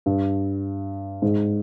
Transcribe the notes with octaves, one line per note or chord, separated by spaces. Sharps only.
G2
G#2